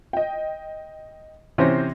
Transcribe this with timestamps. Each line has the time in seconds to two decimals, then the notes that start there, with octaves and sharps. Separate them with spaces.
0.13 D#5 G5
1.58 C3 E3 C#4 C5 A#6